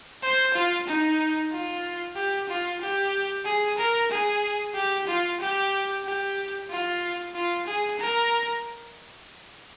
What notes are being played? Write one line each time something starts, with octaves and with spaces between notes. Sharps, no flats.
C5
F4
D#4
F4
G4
F4
G4
G#4
A#4
G#4
G4
F4
G4
G4
F4
F4
G#4
A#4